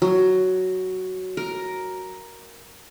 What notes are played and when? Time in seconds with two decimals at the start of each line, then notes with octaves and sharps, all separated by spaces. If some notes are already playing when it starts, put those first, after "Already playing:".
0.02 F#3
1.37 A#4